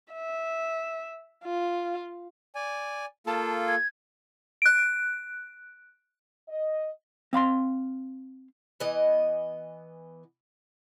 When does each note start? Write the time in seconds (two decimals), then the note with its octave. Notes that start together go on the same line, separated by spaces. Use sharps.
0.13 E5
1.44 F4
2.55 D5 G#5
3.27 A#3 F4 A4 A5
3.67 G#6
4.62 F#6 D7
6.49 D#5
7.33 C4 F5 B5 C6
8.80 E3 B3 D#5